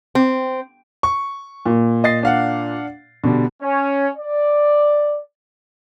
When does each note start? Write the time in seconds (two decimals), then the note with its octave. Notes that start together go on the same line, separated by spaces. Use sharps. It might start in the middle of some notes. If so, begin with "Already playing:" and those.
0.15 C4
1.03 C#6
1.66 A#2
2.04 D#5 A6 C7
2.23 D4 F5 F#5
3.24 B2 D3 G3
3.62 C#4
4.17 D5